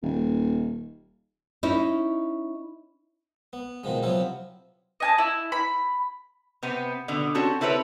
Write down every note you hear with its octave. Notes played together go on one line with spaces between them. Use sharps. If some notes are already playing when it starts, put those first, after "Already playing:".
D#1
C#4 D#4 E4
B3
B2 D#3 F3 G#3
C3 F3 F#3 B3 E4 F4
D#5 G#5 A5
E4
B5
C3 B3 C4
B2 D3 B3
C4 C#4 F#4 A4
C4 E4 A4 B4 C#5